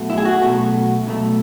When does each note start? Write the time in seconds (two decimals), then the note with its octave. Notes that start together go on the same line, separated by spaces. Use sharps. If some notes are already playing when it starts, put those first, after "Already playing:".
Already playing: B1 B2 A3
0.10 E4
0.18 G#4
0.25 F#4
0.42 B1 B2 A3
1.07 B1 B2 A3